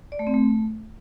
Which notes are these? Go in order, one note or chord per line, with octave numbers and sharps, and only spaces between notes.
D5
A3
C4
A3